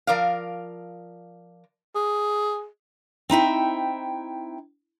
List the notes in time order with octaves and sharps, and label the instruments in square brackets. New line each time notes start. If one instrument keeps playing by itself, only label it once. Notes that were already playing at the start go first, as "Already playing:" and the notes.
[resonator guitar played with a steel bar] F3 A#4 D5 F5
[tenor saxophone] G#4
[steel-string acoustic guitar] C4 D#4 E4 G5